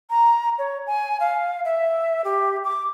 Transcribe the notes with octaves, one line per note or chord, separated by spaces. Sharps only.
A#5
C#5
G#5
F5
E5
G4
D6